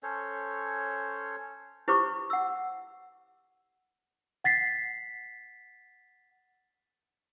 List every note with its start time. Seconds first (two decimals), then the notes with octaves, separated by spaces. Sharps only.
0.03 C#4 A4 C5 C#5
1.88 E4 G4 B4 C5 C#6 D6
2.30 F#5 E6
4.44 F#5 A6 B6 C7